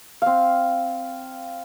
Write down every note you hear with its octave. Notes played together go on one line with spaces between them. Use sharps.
C4 F5